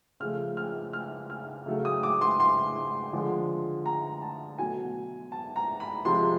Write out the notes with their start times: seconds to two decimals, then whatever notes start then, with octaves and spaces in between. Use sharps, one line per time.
0.20 C#3 F3 A3 F6
0.57 F6
0.93 F6
1.30 F6
1.66 C#3 F#3 A3
1.85 D#6
2.03 D6
2.21 C6
2.40 C6
3.13 D3 F3 G#3
3.86 A#5
4.22 A5
4.58 B2 F#3 A3 G#5
5.32 A5
5.56 A#5
5.80 B5
6.05 C3 F3 G#3 C6